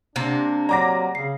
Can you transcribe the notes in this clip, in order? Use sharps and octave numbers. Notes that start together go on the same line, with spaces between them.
C3 A#3 D4
F#3 D5 F#5 A#5 D6 A#6
C#3 C7